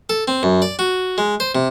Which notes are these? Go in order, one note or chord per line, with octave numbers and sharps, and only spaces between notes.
A4
C4
F#2
D5
F#4
G#3
C5
C3